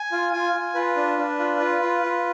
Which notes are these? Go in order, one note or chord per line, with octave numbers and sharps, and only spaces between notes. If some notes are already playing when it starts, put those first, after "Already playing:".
Already playing: G#5
F4
F4 G#5
F4
F4 B4
D4
D4
F4
F4
F4
F4